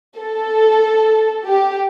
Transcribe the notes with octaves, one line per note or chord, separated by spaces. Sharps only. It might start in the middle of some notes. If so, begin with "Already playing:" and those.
A4
G4